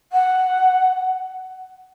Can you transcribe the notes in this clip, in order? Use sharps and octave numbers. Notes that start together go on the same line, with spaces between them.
F#5